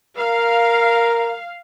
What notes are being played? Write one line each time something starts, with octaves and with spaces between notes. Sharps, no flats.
A#4 F5